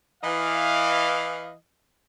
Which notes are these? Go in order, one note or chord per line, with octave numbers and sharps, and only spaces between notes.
E3 D#5 F5